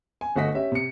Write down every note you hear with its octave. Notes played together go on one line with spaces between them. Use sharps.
G#5
G1 A3 F#4 D#5 B6
C#4 G4 E5
C3 C#7